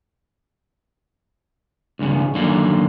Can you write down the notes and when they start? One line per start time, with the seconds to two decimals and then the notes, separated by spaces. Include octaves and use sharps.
1.99 C#2 G2 C#3
2.35 F#2 D3 D#3 A#3